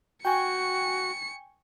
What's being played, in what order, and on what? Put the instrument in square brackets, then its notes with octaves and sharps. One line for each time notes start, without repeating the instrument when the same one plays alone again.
[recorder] F#4 [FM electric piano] G5 G#5 C#6 [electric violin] C#7